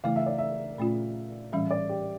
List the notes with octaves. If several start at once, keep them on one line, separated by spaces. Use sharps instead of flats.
C#3 E3 A3 E4 F5
E5
D5
E5
A#2 A3 C#4 F4
A2 E3 G3 C#4 E5
D5
G4